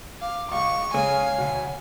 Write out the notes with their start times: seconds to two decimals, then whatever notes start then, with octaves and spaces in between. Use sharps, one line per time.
0.22 F5 D6
0.51 C#2 F5 C#6
0.94 C#3 G#3 C#5 F5 G#5
1.38 D2 B2